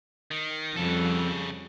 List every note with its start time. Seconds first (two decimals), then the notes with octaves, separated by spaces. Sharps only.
0.31 D#3
0.76 F2 C#3 F3 G3 A4